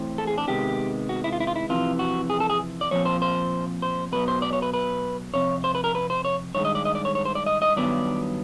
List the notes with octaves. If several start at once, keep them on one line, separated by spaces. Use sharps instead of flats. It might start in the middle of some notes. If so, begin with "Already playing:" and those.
Already playing: A2 E3 A3 C4
A4
G#4
D4
C3 D#3 G#3 B3 G4
F#4
E4
F4
E4
F4
E4
F2 C3 E3 F4
F#4
G#4
A4
G#4
D5
A#2 F3 C4 C#5
C5
C5
C5
B2 F#3 B3 B4
C5
D5
C#5
B4
B4
F2 C3 C#5
C5
B4
A#4
B4
C5
C#5
G2 D#3 G#3 C#5
D#5
D5
D#5
D5
C#5
C#5
C5
D5
D#5
D#5
G2 D#3 F#3 B3 D5